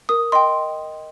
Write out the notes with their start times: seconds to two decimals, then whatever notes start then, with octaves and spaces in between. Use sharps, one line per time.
0.09 A#4 D#6
0.32 D#5 G5 C6